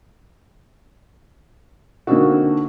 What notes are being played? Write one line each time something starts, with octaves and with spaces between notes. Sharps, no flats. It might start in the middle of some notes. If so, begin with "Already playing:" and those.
D3 A#3 C4 D4 D#4 F#4